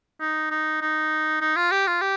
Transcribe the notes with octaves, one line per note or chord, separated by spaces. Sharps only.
D#4
D#4
D#4
D#4
F4
G4
F4
G4